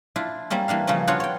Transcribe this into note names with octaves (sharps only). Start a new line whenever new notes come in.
D4 E4 F4
G3 A#3 C4 C#4
E3 A#3 D4 F5
C#3 F3 G3 C#4
B3 D4 F4 F#4 C#5
C#5 G5